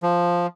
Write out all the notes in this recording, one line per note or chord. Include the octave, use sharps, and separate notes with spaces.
F3